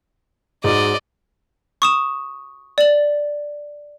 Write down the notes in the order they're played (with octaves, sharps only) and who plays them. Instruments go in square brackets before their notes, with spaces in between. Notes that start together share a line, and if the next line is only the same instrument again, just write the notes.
[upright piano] G#2 F#4 [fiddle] D5 D#5
[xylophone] C#6 D#6 E7
D5 F#7